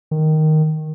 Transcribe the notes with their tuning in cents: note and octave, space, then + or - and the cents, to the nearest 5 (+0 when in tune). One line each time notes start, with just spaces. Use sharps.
D#3 +0